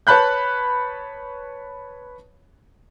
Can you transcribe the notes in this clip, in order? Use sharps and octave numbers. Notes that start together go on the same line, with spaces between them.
B4 C#5 A5 B5 F#6 G6